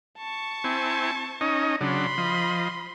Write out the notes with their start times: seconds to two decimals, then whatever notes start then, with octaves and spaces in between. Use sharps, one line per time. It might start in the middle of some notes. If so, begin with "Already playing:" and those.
0.18 A5 C#6
0.64 C4 E4 G#5
1.41 C#4 D#4 D#5
1.81 C#3 F#3 D4 B5 C6
2.18 F3 D#5